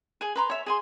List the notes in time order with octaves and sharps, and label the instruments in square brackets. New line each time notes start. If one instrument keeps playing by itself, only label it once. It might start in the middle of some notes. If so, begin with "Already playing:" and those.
[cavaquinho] G#4 G#5
B4 A#5 C6
C#5 E5
G#4 G#5 C6